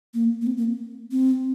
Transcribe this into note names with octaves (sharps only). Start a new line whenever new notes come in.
A#3
A#3
C4
A#3
C4